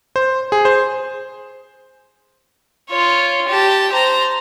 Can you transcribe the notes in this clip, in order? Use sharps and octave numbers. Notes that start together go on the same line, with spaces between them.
C5
G#4
C5
F4 C#5
G4 A5
C5 A#5